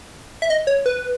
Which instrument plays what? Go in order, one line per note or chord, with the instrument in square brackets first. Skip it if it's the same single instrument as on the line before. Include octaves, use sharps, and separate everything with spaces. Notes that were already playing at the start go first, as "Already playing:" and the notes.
[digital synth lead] E5
D#5
C#5
B4